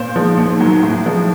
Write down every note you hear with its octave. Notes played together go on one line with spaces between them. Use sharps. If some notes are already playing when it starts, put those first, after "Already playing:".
Already playing: A#2 C5
F3 G#3
D#2
D#3 F#3
A2
F3 G#3